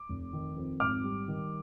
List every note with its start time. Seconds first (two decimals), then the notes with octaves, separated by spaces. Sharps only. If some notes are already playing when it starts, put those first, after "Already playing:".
Already playing: D6
0.09 F1
0.33 D#3
0.56 F2
0.80 G#1 D6 F6
1.04 G3
1.28 D#3